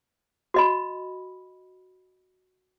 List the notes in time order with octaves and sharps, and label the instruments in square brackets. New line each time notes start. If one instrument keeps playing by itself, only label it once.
[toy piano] F#4 D#5 B5